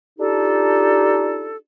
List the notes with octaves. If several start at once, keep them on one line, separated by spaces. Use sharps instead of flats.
D4 D#4 F4 G4 A4